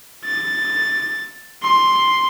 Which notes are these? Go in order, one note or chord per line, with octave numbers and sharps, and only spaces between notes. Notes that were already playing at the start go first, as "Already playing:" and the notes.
A6
C6